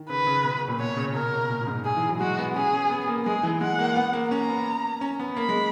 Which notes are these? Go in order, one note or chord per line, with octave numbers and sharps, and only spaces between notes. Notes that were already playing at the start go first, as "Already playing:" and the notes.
Already playing: D#3
C#3 B4
C#3
B2
B2
A#2
B2 C#5
C#3
B2 A#4
B2
A#2
A#2
G#2
G#4
E3
F#3
G#3 F#4
B3
C#4 G#4
C#4
B3
A#3
G#3 G#4
E3
G#3 F#5
A#3
B3
A#3
C#4 A#5
B3
C#4
B3
A#3 B5
G#3